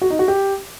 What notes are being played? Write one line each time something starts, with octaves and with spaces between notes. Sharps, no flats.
F#4
D#4
F#4
G4